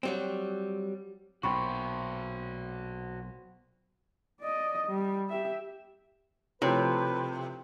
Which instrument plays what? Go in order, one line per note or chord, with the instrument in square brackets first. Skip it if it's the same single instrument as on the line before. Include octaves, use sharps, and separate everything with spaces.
[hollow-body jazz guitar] F#3 G3 C4
[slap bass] B1 A#2 [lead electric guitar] F#4 C5 [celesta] G5 B5 C#6
[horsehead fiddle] D5 D#5
G3
G4 E5
[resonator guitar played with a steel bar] C3 [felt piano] F3 A3 C4 [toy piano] E4 C#5 [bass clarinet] B4